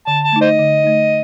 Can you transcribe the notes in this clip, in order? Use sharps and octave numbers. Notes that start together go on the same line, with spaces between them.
D3 A5
A5
A3 D#4
C5 D#5
D3
A3 D#4